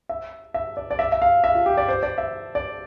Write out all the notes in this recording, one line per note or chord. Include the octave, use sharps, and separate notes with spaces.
E5
E5
D5
D5
E5
E5
F5
E5
F4
G4
D5
C5
D5
E5
D5